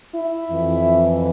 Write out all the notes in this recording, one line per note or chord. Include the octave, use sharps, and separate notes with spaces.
E4
F2 E3